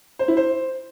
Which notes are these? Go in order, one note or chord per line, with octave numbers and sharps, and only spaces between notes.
C5
E4
C5